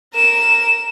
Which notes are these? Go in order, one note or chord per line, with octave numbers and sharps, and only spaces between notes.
A#4 E7